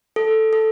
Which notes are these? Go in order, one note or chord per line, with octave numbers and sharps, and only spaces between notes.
A4
A4